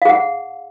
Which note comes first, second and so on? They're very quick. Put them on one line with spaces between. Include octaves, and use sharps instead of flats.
F5 G#4 F#5